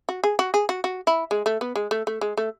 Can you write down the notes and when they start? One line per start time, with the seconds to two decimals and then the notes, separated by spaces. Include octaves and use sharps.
0.09 F#4
0.24 G#4
0.39 F#4
0.54 G#4
0.69 F#4
0.84 F#4
1.07 E4
1.31 G#3
1.46 A3
1.61 B3
1.76 G#3
1.91 A3
2.07 A3
2.21 G#3
2.37 A3